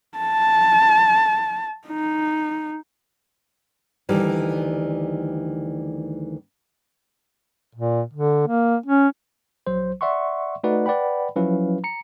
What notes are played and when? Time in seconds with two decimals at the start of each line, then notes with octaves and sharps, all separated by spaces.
0.18 A5
1.88 D#4
4.09 D2 D#3 E3 G3
7.75 A#2
8.14 D3
8.47 A#3
8.86 C#4
9.67 A#1 F#3 C5
10.01 D5 E5 F#5 C6 C#6
10.64 A3 D#4 F#4 B4 D5 F#5
10.86 B4 D5 F#5 G5 B5
11.36 F3 F#3 C#4 E4 B4 F5
11.84 A#5 C#7